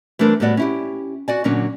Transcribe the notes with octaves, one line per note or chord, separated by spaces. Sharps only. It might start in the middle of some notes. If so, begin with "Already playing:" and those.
E3 G3 A3 D4 A#4 C5
A2 G3 B3 F#4 D5
C#4 E4 G4
F#4 D5 G#5
A#2 D3 F#3 C#4 D4